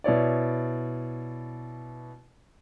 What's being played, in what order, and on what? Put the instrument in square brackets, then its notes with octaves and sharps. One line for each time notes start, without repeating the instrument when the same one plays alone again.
[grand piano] B2 E4 C#5 D5